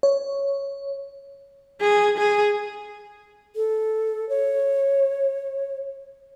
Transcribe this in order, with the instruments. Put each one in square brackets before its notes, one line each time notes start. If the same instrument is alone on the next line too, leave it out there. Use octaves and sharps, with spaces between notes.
[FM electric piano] C#5
[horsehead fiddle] G#4
G#4
[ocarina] A4
C#5